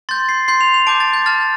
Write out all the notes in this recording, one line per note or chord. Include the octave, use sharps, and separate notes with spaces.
C6 G6 A6
C7
C6 G6 C7
F7
F7
A5 D6 G6 D7
A6
G6
A5 F6 A6